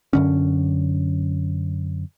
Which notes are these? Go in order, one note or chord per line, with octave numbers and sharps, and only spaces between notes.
F#2 D3 C#4